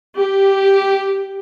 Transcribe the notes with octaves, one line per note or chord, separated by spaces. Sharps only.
G4